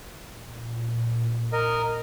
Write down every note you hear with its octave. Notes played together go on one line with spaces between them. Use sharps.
A#2
A#4 D#5